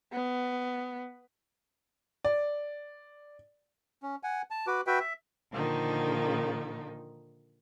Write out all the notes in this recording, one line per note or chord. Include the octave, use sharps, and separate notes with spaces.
B3
D5
C#4
F#5 G#5
A5
F#4 B4 D6
F#4 B4 E5 G5
E5
A#2 D3 D#3 F3 D#4